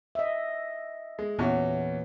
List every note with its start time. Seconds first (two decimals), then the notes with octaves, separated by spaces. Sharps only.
0.15 D#5 E5
1.19 G#3
1.39 E2 A#2 E3 C#4 F#4